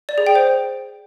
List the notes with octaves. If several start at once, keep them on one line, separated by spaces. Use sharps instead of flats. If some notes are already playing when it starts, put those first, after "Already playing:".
D5
G#4
G5
C5